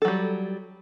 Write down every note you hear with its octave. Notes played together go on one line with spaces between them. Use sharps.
F#3 G3 A4